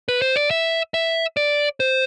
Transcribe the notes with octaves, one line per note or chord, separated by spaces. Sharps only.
B4
C5
D5
E5
E5
D5
C5